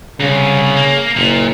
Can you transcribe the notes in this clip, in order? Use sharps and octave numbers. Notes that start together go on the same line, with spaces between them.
C2 C#3
A#3
F#1 A#2